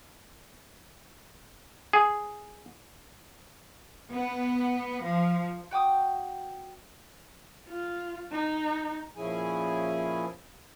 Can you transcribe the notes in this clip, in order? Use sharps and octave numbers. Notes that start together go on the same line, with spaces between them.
G#4
B3
F3
F#4 G5 D6 D#6
F4
D#4
A#2 F3 C#4 E4 G#4 G#5